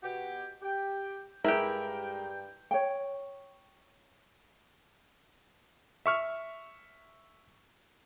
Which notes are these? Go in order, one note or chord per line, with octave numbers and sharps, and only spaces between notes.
B2 F#4 G4
G4 G5
G2 G#3 E4 G4 A#4 G5
C#5 G5
E5 C#6 F6